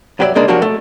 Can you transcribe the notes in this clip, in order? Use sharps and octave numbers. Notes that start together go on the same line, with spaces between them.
G2 F#3 G4 B4 D5 E5
C#3 G#3 A#3 D4
F3 F#3 A#3 D4 F#4 G4
A3